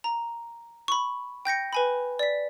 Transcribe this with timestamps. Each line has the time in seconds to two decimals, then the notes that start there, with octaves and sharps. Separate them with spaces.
0.04 A#5
0.88 B5 C#6
1.45 G5 G6 A#6 C#7
1.73 B4 G#5 B5
2.19 D5 B6